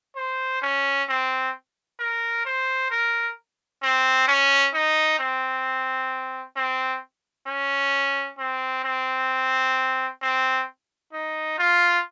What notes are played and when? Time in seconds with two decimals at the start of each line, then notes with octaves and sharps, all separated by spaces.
0.16 C5
0.62 C#4
1.09 C4
2.00 A#4
2.45 C5
2.91 A#4
3.83 C4
4.28 C#4
4.74 D#4
5.19 C4
6.56 C4
7.47 C#4
8.38 C4
8.84 C4
10.22 C4
11.13 D#4
11.58 F4